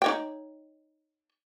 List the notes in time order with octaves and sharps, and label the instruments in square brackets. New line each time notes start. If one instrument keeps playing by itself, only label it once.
[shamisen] D#4 C#5 G5